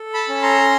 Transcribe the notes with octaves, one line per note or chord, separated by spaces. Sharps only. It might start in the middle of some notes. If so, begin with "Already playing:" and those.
Already playing: A4
A5 B5
C#4
A#5 C6